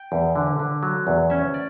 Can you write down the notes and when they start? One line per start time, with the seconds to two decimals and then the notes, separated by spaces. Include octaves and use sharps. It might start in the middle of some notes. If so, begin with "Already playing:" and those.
Already playing: G5
0.12 E2
0.36 D3
0.59 D3
0.83 F#3
1.07 E2
1.30 C#4 E5
1.54 D5